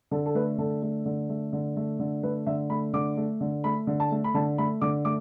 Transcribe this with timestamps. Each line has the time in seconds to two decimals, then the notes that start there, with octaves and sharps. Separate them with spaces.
0.11 D3 A4
0.26 A4
0.35 A3 B4
0.58 D3 A4
0.82 A3
1.06 D3
1.29 A3
1.53 D3
1.76 A3
1.99 D3
2.23 A3 B4
2.46 D3 E5
2.70 A3 B5
2.93 D3 D6
3.17 A3
3.41 D3
3.64 A3 B5
3.87 D3
4.00 A5
4.11 A3
4.24 B5
4.34 D3 A5
4.58 A3 B5
4.81 D3 D6
5.05 A3 D6